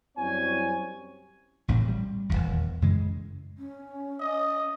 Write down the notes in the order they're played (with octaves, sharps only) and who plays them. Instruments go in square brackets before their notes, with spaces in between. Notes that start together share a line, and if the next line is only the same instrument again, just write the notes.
[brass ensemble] F#2 G3 C4 E4 C#5 G#5
[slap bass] A1 A2 C#3 C4
G3
D#1 A#1 E2
F#2 C#3 E3 G#3
[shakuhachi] C#4
[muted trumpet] D#5